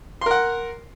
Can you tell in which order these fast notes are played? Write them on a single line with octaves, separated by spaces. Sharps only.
C6 A#4 F#5